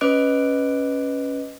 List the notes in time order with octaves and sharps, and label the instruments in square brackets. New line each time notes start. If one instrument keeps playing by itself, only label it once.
[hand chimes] C#4 B4 D#5 D6 F#6 D7